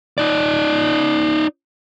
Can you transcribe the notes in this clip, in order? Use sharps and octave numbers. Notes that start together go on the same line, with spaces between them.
D#4 D5